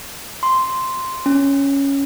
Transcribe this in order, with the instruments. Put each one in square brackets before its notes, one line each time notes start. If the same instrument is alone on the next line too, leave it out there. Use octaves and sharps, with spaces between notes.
[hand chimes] C6
C#4